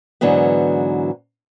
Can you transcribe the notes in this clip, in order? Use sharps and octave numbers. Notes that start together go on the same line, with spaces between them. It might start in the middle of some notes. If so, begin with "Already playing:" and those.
G#2 D3 E3 F#3 B3